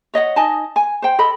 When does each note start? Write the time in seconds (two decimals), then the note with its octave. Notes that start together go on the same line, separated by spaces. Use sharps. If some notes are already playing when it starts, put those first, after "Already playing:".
0.14 C#5 D#5 E5 F#5
0.36 D#4 D#5 G#5 A5
0.76 G#5
1.02 C5 G5
1.19 A4 D#5 B5